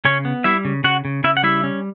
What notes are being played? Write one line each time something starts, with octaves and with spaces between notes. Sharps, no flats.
C#3 C#4 C#5
B3
G3 E4 E5
C#3
C#3 F#4 F#5
C#3
C#3 E4 E5
F#5
G3 E4 E5
C#4